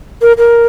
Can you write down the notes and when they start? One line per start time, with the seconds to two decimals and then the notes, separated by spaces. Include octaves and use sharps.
0.22 A#4
0.38 A#4